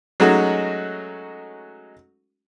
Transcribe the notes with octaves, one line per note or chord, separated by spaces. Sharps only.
F#3 G#3 A3 C#4 D#4 F#4